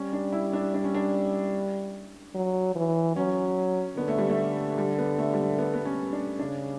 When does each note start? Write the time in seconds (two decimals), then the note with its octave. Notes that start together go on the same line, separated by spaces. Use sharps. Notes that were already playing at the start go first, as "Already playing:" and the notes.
Already playing: G3 C#4
0.13 D4
0.32 E4
0.53 D4
0.74 D4
0.84 C#4
0.95 D4
2.35 F#3
2.76 E3
3.16 F#3 C#4
3.97 D3 B3
4.08 A3
4.18 G3
4.29 A3
4.78 G3
4.98 B3
5.18 A3
5.34 G3
5.38 A3
5.58 B3
5.74 B3
5.85 C#4
6.13 D4
6.39 C#3 D4